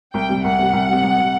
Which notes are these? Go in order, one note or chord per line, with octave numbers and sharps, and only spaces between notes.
C2 G5
C3 G3
C2 F#5
C3 G3
C2
C3 G3
C2
C3 G3